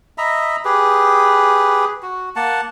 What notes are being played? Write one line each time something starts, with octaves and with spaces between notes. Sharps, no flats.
D#5 E5 A#5 B5
G4 G#4 B4
F#4
A#3 F#5 A5